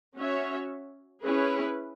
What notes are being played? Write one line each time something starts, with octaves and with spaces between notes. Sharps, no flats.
C#4 F#4 C#5 E5
C#4 E4 G#4 B4